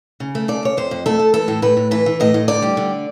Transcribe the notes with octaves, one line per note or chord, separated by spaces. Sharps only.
C#3
A3
C#3 D5
C#3 C#5
F2 C5
F2
A3 A4
A3
E3 A4
A2
A2 B4
A2
E3 B4
E3
A2 D#5
A2
D3 D5
G3
D3